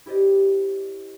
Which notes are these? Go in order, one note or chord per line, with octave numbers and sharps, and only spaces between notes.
E4 G4 C5 D5 D#5